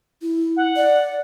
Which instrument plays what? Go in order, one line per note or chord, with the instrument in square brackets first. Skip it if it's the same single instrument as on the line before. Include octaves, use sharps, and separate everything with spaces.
[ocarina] E4
[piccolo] F#5
[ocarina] D5